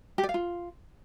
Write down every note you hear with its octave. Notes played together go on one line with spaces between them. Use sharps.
G4
D5
F5
F4